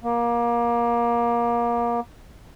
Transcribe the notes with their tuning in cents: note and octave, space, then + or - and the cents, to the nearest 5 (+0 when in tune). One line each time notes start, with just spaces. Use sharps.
A#3 +25